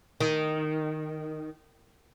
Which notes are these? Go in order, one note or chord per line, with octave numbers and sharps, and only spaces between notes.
D#3